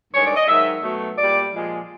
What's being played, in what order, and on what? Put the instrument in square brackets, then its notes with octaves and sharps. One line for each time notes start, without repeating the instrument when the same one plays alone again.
[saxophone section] G2 D#3 G#3 C#5
D5
D#5
G#2 D#3 F#3 E5
B2 F#3 A3
A#2 G3 D5
A#2 F3 G#3